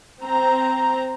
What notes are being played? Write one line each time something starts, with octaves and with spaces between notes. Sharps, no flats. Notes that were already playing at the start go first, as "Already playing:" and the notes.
C4 A#5